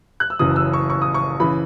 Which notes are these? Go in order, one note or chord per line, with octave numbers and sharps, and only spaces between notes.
F#6
E6
F#1 F#2 C#3 E3 D#6
E6
C#6
C#6
D#6
C#6
C#3 E3 B5